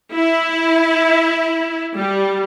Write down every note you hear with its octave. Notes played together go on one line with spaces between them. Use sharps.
E4
G3